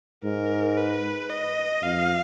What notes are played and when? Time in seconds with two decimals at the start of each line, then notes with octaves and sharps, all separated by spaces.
0.24 G#2 A#4
0.77 B4
1.30 D#5
1.83 F2 F5